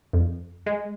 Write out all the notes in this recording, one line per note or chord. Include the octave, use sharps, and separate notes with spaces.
F2
G#3